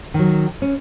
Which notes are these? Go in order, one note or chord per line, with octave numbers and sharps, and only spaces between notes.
D#3 F#3
C#4